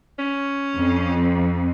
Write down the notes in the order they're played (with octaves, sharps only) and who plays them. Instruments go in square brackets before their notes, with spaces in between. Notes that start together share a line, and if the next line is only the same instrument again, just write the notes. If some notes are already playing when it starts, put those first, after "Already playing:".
[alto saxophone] C#4
[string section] F2